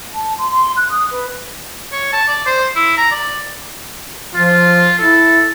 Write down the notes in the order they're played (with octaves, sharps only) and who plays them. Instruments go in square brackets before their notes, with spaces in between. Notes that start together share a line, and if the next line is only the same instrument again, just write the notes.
[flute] A5
C6
C6
F#6
D#6
B4
[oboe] C#5
A5
D5
C5
E4
A#5
D5
[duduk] F3 [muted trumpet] F4
[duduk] E4 [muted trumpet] A4